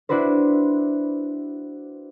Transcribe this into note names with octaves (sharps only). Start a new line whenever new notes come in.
D4 E4 F#4 B4 C5